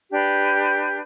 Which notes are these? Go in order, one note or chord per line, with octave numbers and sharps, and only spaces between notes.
D4 G4 B4 G6